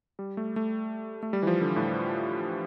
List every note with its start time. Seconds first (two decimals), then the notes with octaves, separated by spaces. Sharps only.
0.19 G3
0.37 A3
0.56 A3
1.23 A3
1.33 G3
1.43 E3
1.47 F3
1.61 D3
1.76 A2